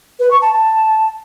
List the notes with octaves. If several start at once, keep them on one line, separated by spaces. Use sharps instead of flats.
B4
C#6
A5
A5